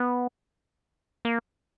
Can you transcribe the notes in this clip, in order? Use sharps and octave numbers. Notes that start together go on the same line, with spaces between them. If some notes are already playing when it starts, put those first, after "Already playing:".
Already playing: B3
A#3